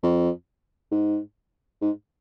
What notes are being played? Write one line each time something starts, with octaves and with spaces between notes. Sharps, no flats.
F2
G#2
G#2